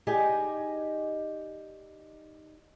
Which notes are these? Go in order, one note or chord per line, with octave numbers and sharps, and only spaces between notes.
D#4 G4 G#4 D5 D#5 G#5